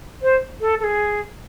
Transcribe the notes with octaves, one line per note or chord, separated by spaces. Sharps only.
C5
A4
A4
G#4